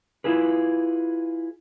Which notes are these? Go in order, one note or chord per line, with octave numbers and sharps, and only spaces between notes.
E4 F4 G#4 B4